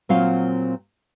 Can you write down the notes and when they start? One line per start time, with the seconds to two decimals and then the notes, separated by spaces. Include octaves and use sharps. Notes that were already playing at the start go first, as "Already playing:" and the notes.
0.09 A#2 F#3 C4 F4 C#5 F5